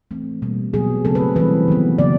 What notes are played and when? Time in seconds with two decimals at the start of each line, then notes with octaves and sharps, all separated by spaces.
0.11 E3 A3 C4
0.42 B2 G3 A#3
0.74 B2 F#3 B3 G#4
1.05 C#3 F#3 A3 C4 A4
1.15 B4
1.36 E3 G3 C4 B4
1.68 D#3 F#3 B3
1.98 C#3 F#3 A#3 D5